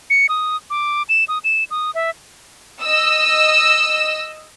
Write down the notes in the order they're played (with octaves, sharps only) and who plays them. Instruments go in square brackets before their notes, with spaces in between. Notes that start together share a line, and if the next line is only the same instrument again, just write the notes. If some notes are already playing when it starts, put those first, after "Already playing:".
[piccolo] C#7
D#6
D6
E7
D#6
E7
D#6
E5
[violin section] D#5 E6